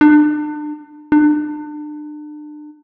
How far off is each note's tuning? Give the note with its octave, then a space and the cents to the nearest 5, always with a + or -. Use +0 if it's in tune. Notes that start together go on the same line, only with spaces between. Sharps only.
D4 +35
D4 +35